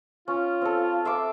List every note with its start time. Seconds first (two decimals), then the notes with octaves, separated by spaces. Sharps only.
0.28 C#4 F4
0.62 C4 A4
1.05 E5 C6 D6